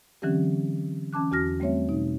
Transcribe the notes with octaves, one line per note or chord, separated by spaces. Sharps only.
D3 E3 F#3 C4 C#4 G4
E3 C#4 A5 D6 F#6
E2 F#4 F6 A#6
G3 A3 C4 C#5 E5
B2 D#4